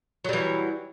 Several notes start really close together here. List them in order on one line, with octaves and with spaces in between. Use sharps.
F#3 G3 E3